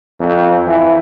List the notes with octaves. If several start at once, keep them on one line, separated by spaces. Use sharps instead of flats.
F2
E3